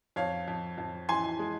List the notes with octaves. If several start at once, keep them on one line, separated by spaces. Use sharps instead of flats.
F2 C#5 F5
F2
F2
E3 G#5 C6
G#3